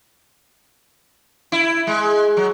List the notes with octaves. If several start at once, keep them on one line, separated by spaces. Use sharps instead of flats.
E4
G#3
F#3